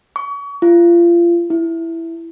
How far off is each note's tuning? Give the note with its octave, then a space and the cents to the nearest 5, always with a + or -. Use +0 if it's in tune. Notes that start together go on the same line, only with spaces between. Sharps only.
C#6 +35
F4 -30
E4 +5